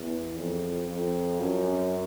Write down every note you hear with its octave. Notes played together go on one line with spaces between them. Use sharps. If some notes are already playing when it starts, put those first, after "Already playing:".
Already playing: E2
F2
F2
F#2